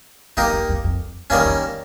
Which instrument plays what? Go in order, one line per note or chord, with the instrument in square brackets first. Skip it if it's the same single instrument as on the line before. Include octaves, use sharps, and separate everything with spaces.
[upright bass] F2 [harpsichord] A#3 D#4 G4
[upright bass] E2
F2
F2
[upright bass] F2 [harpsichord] D#3 G3 A#3 C#4
[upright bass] F2